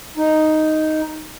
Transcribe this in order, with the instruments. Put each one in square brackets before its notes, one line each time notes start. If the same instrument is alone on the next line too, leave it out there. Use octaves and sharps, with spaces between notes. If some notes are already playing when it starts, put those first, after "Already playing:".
[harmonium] D#4